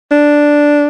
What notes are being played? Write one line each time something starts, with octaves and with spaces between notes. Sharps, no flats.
D4